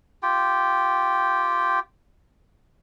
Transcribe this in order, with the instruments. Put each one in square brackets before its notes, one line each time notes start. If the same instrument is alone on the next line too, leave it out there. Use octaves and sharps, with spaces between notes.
[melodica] F4 G4 G5